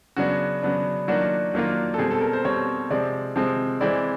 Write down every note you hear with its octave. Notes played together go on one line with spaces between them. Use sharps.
C#3 F#3 B3 D4 F#4
C#3 F#3 B3 D4
D#3 F#3 A#3 D4 F4 F#4
D#3 F#3 A#3 D4 F4
A4
B2 G3 C4 G#4
A4
A#4
C5
B2 G3 C4 C#5
C3 F3 G#3 C4 D5
C3 F3 G#3 C4
E3 G#3 C4 E4 D5